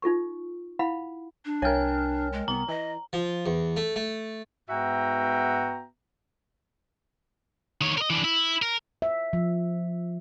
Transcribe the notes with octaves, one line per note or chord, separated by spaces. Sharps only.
D#4 F4 A4 C#6
E4 F5 F#5 B5
D4
C2 A#4 C#5 G5 G#5 F6
G#3
C2 B3 A#5
E3 D#5
F3
E2
A3
A3
G#2 B3 F#4 E5 G5 A#5
D#3 C#5
A#4 D#5
E3 D4
E4
A#4
E5
F3